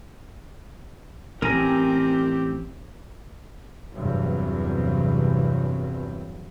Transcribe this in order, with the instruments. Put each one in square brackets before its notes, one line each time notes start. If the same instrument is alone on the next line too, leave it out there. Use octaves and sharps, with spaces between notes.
[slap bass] A1 [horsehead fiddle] C4 G4 [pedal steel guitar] A#4 G#5 A#5
[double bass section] E2 G2 C3 E3 F#3